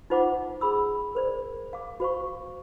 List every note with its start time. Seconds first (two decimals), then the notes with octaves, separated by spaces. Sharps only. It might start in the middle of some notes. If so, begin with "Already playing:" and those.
0.10 D#4 F4 C5 F#5 A5 D6
0.61 G#4 B5 E6
1.15 A#4 C5 D5
1.73 F5 D6
2.00 F#4 C5 F5 C#6